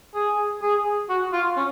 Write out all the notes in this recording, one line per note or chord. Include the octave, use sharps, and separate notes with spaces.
G#4
G#4
F#4
F4
C#4